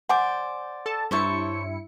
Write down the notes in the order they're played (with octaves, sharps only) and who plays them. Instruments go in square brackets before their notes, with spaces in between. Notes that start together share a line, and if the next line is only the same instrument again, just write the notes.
[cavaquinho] C5 D5 [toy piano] F#5 G#5 D6
[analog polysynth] A4 A5
[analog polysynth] G2 E4 C#7 [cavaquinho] C5 C#5 A5